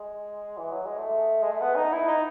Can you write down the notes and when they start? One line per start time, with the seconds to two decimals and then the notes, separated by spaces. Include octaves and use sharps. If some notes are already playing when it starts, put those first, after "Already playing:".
Already playing: G#3
0.58 E3
0.71 F#3
0.86 G#3
0.99 A3
1.43 G#3
1.52 A3
1.62 B3
1.76 D#4
1.92 E4
2.08 D#4